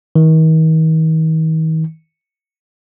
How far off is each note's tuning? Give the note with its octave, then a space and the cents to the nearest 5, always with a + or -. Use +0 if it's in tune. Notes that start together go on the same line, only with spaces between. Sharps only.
D#3 +40